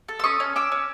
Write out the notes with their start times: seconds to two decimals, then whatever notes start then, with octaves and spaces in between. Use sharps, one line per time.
0.08 A4
0.20 E6
0.24 C#4 C#6 D#6
0.40 C#4
0.56 C#4 D6 E6
0.72 C#4